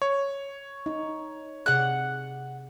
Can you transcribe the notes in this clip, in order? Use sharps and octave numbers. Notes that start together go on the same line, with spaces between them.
C#5
D#4
C3 G#4 D5 F#5 F#6